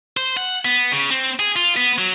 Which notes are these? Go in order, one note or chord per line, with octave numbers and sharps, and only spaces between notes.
C5
F#5
B3
C#3
C4
G#4
F4
B3
F#3